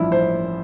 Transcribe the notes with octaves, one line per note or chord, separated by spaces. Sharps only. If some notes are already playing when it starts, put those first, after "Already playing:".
Already playing: A1 G2 F3 E4
C5